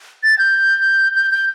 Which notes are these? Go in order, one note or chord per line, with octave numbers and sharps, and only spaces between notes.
A6
G6
G6
G6